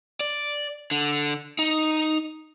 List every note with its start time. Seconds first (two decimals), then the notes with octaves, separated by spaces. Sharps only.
0.20 D5
0.91 D3
1.59 D#4